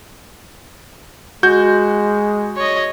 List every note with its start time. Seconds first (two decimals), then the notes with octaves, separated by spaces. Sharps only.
1.43 G#3 F#4 G6
2.57 C#5 D#5